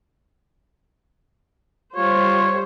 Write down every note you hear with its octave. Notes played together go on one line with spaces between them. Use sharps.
G3 F4 C5 C#5